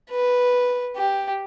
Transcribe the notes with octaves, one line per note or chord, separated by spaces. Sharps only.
B4
G4